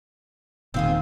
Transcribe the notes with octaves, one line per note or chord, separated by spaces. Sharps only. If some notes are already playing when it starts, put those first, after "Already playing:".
E1 A#2 D#3 C4 F4 G#4